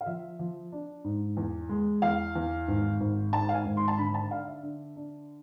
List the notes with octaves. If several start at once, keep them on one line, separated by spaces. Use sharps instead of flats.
F5
F3 E5
F3
D4
G#2
E2
G#3
E2 F5
E2
G#1
G#1
G#2 A5
F5
G#5
G#1
C6
A5
D3 B5
A5
D4 F5
E5
D3
D4